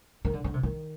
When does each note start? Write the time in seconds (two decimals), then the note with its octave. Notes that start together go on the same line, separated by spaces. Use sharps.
0.25 D#3
0.33 D3
0.44 D3
0.54 C3
0.63 D#3